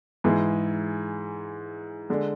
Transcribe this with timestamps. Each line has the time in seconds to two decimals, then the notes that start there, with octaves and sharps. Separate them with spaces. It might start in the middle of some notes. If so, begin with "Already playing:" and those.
0.24 G#2 E3 G#3
2.10 D3 G#3